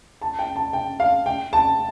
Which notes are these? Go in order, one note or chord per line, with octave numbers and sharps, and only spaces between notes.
A5
G5
A5
G5
F5
G5
A5